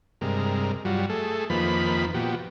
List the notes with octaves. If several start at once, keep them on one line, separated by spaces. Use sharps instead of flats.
G2 C3 G#3 A#4
G2 F#3 G3 F4 F#4
A3 G#4 A4
F2 D#3 F3 A#3 B4 B5
A#2 F3 B3 F#4 G4